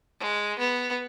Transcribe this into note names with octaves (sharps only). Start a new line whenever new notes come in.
G#3
B3